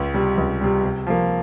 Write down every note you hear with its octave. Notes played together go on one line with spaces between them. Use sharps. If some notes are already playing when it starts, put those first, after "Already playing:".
Already playing: C#2
C3 G3
C#2
C3 G3
C3
F3 A#3